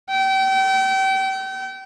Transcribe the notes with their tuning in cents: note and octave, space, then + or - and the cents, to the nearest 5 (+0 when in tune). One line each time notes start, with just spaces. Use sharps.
G5 -35